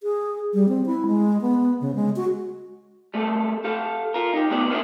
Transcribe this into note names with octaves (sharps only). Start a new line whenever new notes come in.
G#4
G3
C4
E4
G#3
B3
C#3
G#3
F#4
G3 A3 A#3 A4
G4 A4 F5
F4 A#4
D#4 G4
A2 B3 G4 D5
A#3 B3 D4 E4 G4